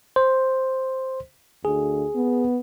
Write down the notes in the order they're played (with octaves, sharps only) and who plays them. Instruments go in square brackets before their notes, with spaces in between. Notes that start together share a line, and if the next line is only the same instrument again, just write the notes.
[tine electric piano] C5
[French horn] D2 [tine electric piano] G#4
[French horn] B3